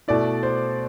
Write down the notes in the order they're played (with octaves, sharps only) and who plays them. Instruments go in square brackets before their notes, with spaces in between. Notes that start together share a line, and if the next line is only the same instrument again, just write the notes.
[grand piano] B2 A3 E4 D5
C5